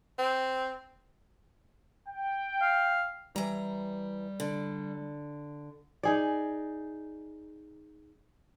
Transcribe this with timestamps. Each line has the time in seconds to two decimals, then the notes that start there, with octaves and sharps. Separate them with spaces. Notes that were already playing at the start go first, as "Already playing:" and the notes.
0.19 C4
2.09 G5
2.61 F5
3.36 E3 G3 A#5
4.40 D3
6.03 D#4 G#4 D5